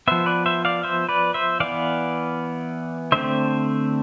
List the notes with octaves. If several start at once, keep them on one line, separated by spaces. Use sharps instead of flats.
F3 B3 C5 E5
B4 D5
C5 E5
D5 F5
C5 E5
B4 D5
C5 E5
E3 B3 D5 F5
D3 A3 C4 C5 E5